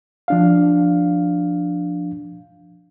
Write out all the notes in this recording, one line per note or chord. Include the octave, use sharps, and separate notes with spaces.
F3 D4 F5